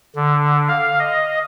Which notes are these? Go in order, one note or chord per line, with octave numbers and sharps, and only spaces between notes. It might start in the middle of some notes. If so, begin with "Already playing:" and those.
D3
F5
D#5